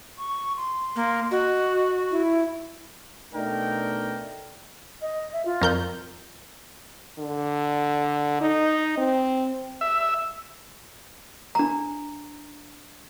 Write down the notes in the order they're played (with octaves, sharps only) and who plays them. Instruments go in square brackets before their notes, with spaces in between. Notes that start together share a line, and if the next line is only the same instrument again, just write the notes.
[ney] C#6
C6
[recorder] A#3
[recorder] F#4 [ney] D#5
[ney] E4
[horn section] B2 A3 D4 D#4 A#4 G5
[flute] D#5
E5
F4
[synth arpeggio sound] F2 A#4 G6
[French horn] D3
D#4
C4
[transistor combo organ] E5
[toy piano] D4 A#5